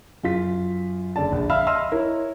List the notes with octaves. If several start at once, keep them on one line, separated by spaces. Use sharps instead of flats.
F#2 F4 B6
F#1 D3 D5 A5
A#1
E5 F5 B5 E6 F6
D#5 B5 C6 E6 F6
E4 A#4 C#5